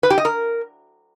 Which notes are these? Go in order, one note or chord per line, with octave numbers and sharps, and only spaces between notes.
B4
G4
D#5
A#4